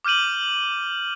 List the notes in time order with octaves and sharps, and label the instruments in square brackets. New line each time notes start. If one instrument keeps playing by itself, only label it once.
[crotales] D6 F6 G6 D#7 F#7